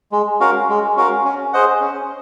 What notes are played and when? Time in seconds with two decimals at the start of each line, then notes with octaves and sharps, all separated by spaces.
0.12 G#3
0.40 C#4 F#4 A#4 F5
0.69 G#3
0.97 C#4 F#4 A#4 F5
1.25 C#4
1.53 G#4 C5 D#5 F#5
1.81 C#4